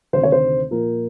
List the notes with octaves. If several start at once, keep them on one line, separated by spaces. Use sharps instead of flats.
D2 C3 D#3 C5
C#5
C5
A#2 F3 A#3 A#4